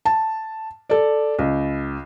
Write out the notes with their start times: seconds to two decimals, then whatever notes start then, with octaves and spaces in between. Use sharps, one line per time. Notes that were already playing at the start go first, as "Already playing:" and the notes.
0.05 A5
0.90 A4 D5
1.39 C#2